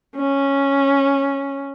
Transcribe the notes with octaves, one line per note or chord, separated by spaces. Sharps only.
C#4